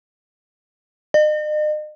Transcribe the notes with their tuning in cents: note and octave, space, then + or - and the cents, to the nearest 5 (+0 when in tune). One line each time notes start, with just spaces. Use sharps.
D#5 -40